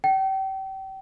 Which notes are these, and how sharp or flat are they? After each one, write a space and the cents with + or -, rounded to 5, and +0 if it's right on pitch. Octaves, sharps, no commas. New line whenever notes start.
G5 -35